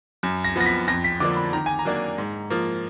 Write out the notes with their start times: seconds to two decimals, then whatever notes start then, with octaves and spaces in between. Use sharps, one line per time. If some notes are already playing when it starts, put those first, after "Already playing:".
0.23 F#2
0.44 A#6
0.56 F3 B3 A#6
0.66 B6
0.88 F2 A#6
1.04 B6
1.20 D3 F3 A#3 D4 D6
1.36 B5
1.53 D#3 A#5
1.66 G#5
1.79 A#5
1.85 F#3 A#3 D4
2.18 G#2
2.50 F3 A#3